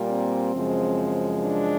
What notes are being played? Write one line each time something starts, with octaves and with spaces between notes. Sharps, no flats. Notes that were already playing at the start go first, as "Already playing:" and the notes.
Already playing: A#2 G3 A#3
C4
F#2 C#3 F3 G#3
D4